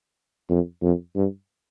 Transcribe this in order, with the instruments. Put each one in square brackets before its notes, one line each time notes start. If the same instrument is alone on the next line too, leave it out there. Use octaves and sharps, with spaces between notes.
[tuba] F2
F2
G2